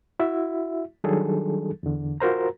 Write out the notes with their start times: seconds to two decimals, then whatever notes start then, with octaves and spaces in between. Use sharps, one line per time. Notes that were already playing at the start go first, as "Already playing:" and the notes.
0.19 E4 F#4 E5
1.04 D#3 F#3 G3 D4 G#4 A4
1.83 E2 D3
2.20 F4 F#4 A#4 C5 A#5